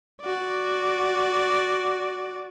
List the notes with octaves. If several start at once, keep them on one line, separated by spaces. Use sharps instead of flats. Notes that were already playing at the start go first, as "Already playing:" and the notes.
F#4 D5